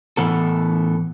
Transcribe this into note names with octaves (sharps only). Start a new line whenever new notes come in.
A2 E3 B3 A4